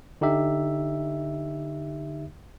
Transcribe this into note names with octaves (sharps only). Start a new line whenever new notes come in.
D3 D#4 G4 E5